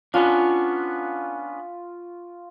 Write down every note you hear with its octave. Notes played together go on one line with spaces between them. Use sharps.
B3 C#4 D4 F4 C#6